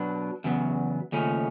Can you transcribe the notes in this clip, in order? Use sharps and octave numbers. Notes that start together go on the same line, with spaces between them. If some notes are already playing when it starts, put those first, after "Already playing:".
Already playing: B2 F#3 B3 D4
E2 C#3 F#3 B3
D#2 C#3 F3 A3 C#4